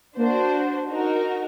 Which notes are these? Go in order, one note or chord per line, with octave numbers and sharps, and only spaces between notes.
A#3 D4 F#4 C5
D#4 F#4 A#4